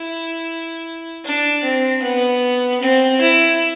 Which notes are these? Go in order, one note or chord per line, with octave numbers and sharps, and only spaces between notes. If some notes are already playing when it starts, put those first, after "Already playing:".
Already playing: E4
D4
C4
B3
C4
E4